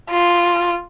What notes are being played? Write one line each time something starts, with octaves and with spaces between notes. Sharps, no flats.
F4